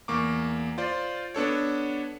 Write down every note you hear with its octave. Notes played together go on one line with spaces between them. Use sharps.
E2 A#3 C#6 D6
F4 C5 D5
B3 D4 A4 C#5